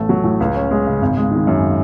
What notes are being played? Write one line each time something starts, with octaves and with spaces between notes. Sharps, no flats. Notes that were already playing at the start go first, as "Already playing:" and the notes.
Already playing: A1 A3
F#3
A2
C#2
C#4
G#3
C#3
G#1
G#3
D#3
F#2